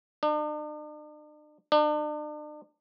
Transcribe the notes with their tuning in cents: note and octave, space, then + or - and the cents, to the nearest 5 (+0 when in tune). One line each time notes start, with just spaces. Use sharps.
D4 +45
D4 +40